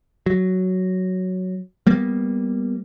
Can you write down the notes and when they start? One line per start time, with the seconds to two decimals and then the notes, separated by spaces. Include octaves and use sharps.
0.26 F#3
1.87 G3 A#3 B3